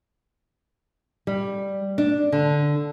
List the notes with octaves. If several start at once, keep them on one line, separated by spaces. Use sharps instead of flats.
G3
D4
D3